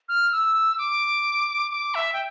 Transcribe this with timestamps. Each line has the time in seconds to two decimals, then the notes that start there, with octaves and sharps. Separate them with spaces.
0.09 F6
0.32 E6
0.78 D6
1.71 D6
1.95 E5
2.13 G5